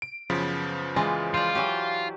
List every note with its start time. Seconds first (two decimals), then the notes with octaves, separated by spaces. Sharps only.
0.02 D7
0.30 F#2 C#3 F3 B3
0.96 E3 G#3 F4
1.34 F4 C5 D5
1.55 E3 F#3 G4